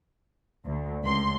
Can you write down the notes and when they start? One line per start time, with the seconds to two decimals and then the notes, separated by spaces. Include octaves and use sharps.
0.66 D2
1.04 C#2 C6